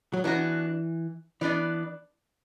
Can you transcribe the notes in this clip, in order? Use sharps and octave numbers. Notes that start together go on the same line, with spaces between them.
F#3
E3 B3 D4 F#4
E3 B3 D4 B4 D5